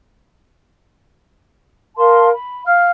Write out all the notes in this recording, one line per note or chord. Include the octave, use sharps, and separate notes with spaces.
A#4 F5 A5 C6
B5
F5 F6